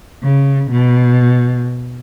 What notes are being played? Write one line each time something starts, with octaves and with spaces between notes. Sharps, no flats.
C#3
B2